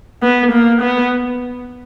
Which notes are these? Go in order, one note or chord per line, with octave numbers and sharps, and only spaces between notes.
B3
A#3
B3